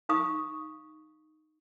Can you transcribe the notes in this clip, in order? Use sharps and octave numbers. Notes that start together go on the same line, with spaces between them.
D#4 F5 C#6 D#6